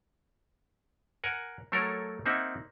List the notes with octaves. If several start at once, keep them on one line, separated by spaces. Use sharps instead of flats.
A#4 F#5 G#5
F#3 A3 A4 A#4 C#5
A#3 C4 D#4 E5 F#5